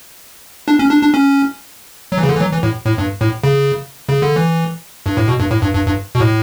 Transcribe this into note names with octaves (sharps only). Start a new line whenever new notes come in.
D4
C#4
D4
D4
C#4
F#3
E3
C#3
D3
E3
F#3
E3
A2
A2
G2
A2
C#3
C#3
D3
E3
G2
A2
B2
G2
A2
G2
G2
G2
B2
A2